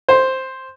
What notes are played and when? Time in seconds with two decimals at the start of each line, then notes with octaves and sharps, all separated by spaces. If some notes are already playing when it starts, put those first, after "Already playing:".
0.08 C5